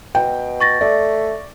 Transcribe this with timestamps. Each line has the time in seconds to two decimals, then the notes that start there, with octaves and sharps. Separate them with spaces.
0.15 B2 G5
0.60 C#6 A6 A#6
0.81 A3 D5